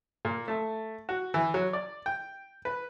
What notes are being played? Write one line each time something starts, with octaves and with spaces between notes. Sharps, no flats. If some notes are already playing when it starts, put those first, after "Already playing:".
A#2
A3
F#4
E3
F#3
D5
G5
B4